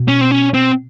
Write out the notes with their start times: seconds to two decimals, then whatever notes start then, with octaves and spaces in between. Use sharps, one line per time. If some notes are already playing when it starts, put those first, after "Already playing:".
Already playing: B2
0.08 C#4
0.21 C4
0.31 C#4
0.54 C4